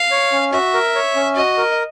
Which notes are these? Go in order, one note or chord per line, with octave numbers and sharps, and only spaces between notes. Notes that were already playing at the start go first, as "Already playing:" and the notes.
Already playing: F5
C#5
C#4
F#4 E5
A#4
C#5
C#4
F#4 D#5
A#4